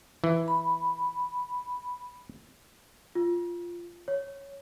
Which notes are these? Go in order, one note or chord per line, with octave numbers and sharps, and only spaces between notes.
E3
B5
F4
C#5